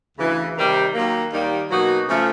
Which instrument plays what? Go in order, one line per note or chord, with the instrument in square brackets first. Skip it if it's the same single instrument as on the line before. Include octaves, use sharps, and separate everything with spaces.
[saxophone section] D2 C#3 E3
C3 D#3 G3
D#3 F#3 A#3
D#2 D#3 G3 A#3 D#4
B2 F#3 A#3 D#4 F#4
C#3 F3 A3